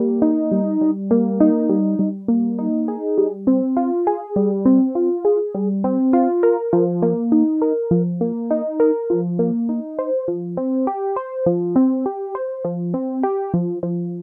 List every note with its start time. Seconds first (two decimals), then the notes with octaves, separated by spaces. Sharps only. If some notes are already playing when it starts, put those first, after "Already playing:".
Already playing: G3 A#3
0.22 D#4
0.52 G3
0.81 G3
1.11 A#3
1.40 D#4
1.69 G3
1.99 G3
2.28 A#3
2.59 D#4
2.88 G#4
3.18 G3
3.47 C4
3.77 F4
4.07 G#4
4.36 G3
4.66 C4
4.95 F4
5.25 G#4
5.55 G3
5.84 C4
6.13 F4
6.43 A#4
6.73 F3
7.02 A#3
7.32 D#4
7.62 A#4
7.91 F3
8.21 A#3
8.51 D#4
8.80 A#4
9.10 F3
9.39 A#3
9.69 D#4
9.99 C5
10.28 F3
10.57 C4
10.87 G4
11.16 C5
11.46 F3
11.76 C4
12.06 G4
12.35 C5
12.65 F3
12.94 C4
13.23 G4
13.54 F3
13.83 F3